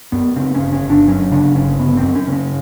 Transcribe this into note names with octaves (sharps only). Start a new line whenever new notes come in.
F#2 B3
C#3 C4
C#4
G1
C#4
G1
D4
F#2 C#4
C#3 D4
G1 C#4
G1 B3
C4
F#2
C#4
C#3
C#4